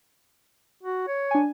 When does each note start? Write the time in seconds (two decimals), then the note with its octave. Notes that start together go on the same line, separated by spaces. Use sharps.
0.83 F#4
1.07 C#5
1.31 D4 G#5